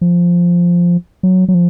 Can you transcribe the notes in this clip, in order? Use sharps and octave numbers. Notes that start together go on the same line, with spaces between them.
F3
F#3
F#3
F3